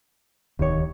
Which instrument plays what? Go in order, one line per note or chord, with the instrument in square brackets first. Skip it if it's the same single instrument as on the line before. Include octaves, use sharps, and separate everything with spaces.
[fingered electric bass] D1 D#3 [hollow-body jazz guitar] D#2 C#5